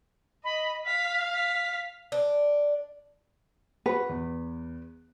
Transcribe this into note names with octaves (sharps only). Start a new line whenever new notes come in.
D#5 B5
F5 B6
B6
D4
F#4 B4 F#5
E2